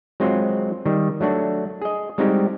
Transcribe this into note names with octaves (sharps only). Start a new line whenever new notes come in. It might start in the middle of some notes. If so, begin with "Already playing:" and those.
F#3 G#3 C4 F4 F#4
D#3 G3
F#3 A3 D4 F#4
G#4 D#5
G3 G#3 C4 D#4 F#4 G4